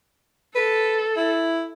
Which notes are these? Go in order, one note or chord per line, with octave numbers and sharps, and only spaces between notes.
A4 B4
E4